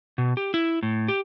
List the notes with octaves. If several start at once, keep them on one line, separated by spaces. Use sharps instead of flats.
B2
G4
E4
A2
G4